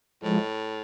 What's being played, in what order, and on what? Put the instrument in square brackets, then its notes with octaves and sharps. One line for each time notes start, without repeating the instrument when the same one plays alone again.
[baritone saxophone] A2 [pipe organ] F3 G#3